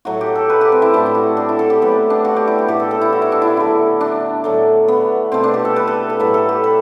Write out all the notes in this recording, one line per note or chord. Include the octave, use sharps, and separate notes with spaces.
A2 F#3 A3 F#4
G4
A4
B4
G4
C4
E4
A2 F#3 A3 D4
E4
F#4
D4
E4
A4
G4
A2 F#3 A3 B3
D4
F#4
G4
E4
F#4
A2 E3 A3 G4
A4
A4
E4
F#4
E4
D4
E4
D3 F#3 A3
D4
A2 F#3 A3
B3
B2 A3 C4
D4
G4
A4
B4
A4
A4
A2 F#3 A3 B4
A4
G4
B4